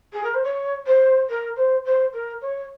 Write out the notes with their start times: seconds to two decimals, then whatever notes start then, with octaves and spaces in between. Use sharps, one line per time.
0.13 G#4
0.23 A#4
0.34 C5
0.44 C#5
0.86 C5
1.29 A#4
1.56 C5
1.85 C5
2.13 A#4
2.42 C#5